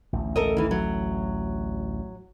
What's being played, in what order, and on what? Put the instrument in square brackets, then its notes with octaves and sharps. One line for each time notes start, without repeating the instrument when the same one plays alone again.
[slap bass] A1 D2
[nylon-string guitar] A4 A#4 D#5
D#3 E3
F#3